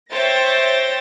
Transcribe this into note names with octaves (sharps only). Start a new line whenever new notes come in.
C5 C#5 E5 G5 A6 A#6